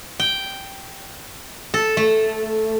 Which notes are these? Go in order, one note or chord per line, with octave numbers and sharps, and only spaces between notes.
G5
A4
A3